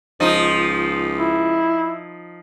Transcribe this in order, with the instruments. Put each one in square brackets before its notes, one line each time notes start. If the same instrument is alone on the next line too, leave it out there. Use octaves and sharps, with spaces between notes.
[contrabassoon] C#2 [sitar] F3 D#4
[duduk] E4